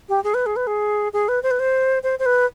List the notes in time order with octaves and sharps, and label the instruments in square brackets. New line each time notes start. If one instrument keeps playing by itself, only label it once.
[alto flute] G4
G#4
B4
G#4
B4
G#4
G#4
B4
C5
B4
C5
C5
C5
B4